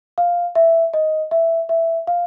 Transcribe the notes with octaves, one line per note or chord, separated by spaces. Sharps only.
F5
E5
D#5
E5
E5
F5